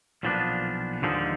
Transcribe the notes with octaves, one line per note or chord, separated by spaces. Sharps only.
B1 A#2 F3 B3 D4
D#2 D3 F3 G#3 D#4